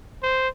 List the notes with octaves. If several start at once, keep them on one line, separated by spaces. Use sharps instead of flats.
C5